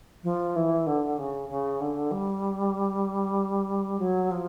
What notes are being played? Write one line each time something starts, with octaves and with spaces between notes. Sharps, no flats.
F3
E3
D3
C#3
C#3
D3
G3
F#3
F3